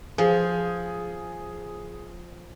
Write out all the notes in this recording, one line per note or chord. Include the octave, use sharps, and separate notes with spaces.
F3 G#4